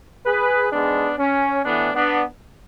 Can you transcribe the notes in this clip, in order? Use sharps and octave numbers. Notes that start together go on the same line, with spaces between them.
G#4 B4
G#2 G#3 B3 D4
C#4
A2 E3 A3 B3 D4
B3 D4